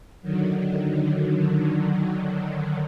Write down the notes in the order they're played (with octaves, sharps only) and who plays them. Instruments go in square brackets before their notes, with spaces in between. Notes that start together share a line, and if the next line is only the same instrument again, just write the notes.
[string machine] D3 D#3 F#3